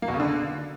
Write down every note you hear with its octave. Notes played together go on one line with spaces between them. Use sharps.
A#3
B2
C#3
D3